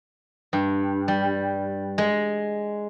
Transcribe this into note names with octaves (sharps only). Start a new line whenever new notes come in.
G2
G3
G#3